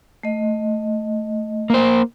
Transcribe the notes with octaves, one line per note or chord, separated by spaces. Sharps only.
A3 D#5
A#3 C5